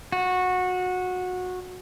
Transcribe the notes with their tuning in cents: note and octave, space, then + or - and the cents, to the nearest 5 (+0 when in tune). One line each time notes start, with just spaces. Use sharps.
F#4 -20